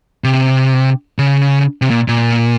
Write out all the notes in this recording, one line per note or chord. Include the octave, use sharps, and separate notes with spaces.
C3
C#3
C3
A#2
A#2